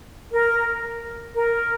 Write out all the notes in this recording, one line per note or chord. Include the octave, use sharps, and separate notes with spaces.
A#4
A#4